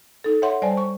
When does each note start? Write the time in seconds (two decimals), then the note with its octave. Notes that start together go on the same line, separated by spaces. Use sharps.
0.24 D#4 A4
0.42 C#5 E5 F#5 C6
0.62 G3 C5 D5 G#5 A5
0.77 C#6